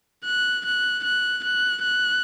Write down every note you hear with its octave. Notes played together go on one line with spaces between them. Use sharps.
F#6
F#6
F#6
F#6
F#6